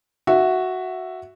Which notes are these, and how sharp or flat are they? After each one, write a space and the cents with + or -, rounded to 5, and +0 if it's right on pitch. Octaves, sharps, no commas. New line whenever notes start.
F#4 +0 E5 +5